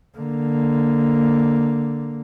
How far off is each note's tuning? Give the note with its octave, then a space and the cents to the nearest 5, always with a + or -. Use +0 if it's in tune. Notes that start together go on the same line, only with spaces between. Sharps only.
D3 +0 A#3 +0